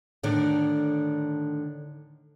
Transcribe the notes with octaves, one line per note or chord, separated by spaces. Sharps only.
A2 D3 D#3 D4